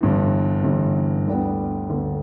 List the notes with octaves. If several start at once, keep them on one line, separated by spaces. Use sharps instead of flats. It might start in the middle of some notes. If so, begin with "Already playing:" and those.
G1 G2 E3
G1 G2 E3
D2 D3 G3 B3
D2 D3 G3 B3